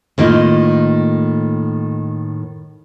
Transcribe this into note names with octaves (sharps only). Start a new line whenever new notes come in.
A2 D#3 A#3 D#4 F4